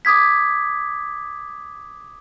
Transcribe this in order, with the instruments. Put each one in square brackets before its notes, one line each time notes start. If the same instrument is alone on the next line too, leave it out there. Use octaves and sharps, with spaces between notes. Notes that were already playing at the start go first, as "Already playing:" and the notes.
[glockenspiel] D6 D#6 G#6 B6